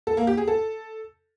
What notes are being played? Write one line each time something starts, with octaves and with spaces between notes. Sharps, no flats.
A4
A#3
G4
G#4
A4